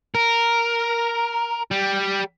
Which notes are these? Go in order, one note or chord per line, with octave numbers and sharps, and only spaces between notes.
A#4
G3